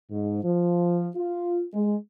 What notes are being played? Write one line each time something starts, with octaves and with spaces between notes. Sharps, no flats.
G#2
F3
F4
G#3